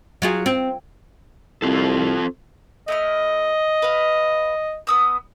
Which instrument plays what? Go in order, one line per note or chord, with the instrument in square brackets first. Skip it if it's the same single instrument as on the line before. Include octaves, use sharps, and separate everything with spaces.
[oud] F#3 F4 G#4
C4
[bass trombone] C2 [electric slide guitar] C4 F4 A4
[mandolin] A3 E4 F6 [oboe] D#5
[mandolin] B4 F5
B3 D#6 E6